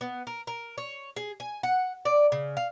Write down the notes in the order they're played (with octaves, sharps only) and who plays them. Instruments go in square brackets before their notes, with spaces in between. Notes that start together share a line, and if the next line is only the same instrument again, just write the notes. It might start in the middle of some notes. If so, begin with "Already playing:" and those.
[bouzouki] B3
A#4
A#4
C#5
G#4
G#5
F#5
D5
C#3
F5